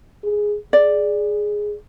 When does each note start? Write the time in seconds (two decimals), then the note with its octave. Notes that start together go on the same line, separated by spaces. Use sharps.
0.24 G#4
0.73 G#4 D5